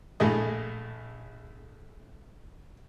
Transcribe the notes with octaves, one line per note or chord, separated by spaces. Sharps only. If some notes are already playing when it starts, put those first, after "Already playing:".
A#1 A2 A3 G#4 D#5